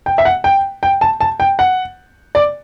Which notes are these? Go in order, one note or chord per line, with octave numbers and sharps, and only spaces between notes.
G5
E5
F#5
G5
G5
A5
A5
G5
F#5
D5